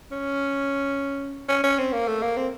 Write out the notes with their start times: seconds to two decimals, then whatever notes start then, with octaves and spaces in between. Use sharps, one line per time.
0.12 C#4
1.49 C#4
1.64 C#4
1.78 C4
1.93 A#3
2.07 A3
2.22 A#3
2.37 C4